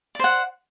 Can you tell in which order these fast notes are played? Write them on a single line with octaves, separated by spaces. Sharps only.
D5 C5 F#5